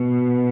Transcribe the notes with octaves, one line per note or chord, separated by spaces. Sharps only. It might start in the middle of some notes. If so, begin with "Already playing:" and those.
Already playing: B2